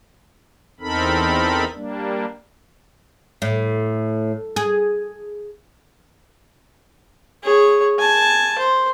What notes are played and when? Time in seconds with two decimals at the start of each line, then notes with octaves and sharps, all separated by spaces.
0.80 E2 C4 D#4 A4 A#4 B5
1.74 G3 A#3 D4
3.42 A2
4.56 G#4
7.43 G#4 C#5
7.99 G#5 A5
8.59 C5